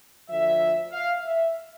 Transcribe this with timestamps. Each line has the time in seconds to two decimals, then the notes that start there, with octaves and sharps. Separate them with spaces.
0.30 D2 D3 F3 E5
0.92 F5
1.23 E5